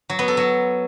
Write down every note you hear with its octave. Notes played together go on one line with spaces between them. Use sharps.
F#3
B3
A4
F#3